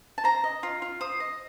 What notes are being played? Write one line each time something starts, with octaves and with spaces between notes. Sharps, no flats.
A5
C5 A#5
D#5
F4
F4
C5 D#6
D#5